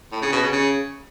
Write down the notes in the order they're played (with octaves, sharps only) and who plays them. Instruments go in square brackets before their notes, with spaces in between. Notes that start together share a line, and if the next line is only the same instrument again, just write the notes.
[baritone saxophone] A2
C#3
B2
C#3
C#3